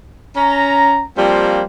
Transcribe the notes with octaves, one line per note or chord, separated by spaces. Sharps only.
C#4 A#5
F3 G3 A#3 C4 C5